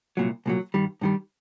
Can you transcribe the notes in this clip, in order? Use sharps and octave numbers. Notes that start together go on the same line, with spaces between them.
C2 A#2 F#3
C2 A#2 F#3
G2 D#3 G3
G2 D#3 G3